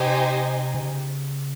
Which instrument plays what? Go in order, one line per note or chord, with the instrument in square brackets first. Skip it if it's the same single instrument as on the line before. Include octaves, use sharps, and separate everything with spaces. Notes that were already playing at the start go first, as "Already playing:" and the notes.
Already playing: [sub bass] C3 [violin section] D#4 G4 C5 D#5 G#5
[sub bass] C#3